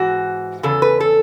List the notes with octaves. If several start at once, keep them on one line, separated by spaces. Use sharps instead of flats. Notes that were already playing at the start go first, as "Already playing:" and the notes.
Already playing: G#2 E3 F#4
E2 C#3 A4
B4
A4